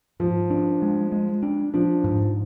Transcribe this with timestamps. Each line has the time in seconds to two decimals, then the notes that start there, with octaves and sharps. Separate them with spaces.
0.20 G#2 F3
0.50 D4
0.82 G#3
1.12 G#3
1.43 D4
1.74 F3 D4
2.04 G#2